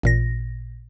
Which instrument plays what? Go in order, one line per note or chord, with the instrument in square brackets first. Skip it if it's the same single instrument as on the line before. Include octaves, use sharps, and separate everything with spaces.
[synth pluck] A1 A#2 A#6